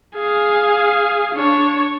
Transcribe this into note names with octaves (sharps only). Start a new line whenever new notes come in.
G#4 F5
D4 C#5